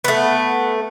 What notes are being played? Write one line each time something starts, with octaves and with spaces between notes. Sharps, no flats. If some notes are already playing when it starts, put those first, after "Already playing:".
A3 B3